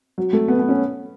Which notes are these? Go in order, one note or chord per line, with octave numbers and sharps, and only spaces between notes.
F#3
A3
B3
B3
C#4